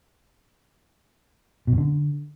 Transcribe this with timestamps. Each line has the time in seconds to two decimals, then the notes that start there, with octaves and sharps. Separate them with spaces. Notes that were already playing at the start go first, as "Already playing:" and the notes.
1.67 B2
1.73 F#2
1.78 D3